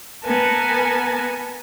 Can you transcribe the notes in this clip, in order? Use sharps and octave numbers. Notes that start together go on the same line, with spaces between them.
B3 A#4 B4 G#5 A5